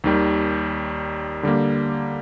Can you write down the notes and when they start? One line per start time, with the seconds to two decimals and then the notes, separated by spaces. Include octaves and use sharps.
0.04 D#2 D#3 G3
1.43 D3 G3 A#3